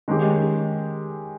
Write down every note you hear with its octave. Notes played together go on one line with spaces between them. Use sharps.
D#3 G#3 C#4 G4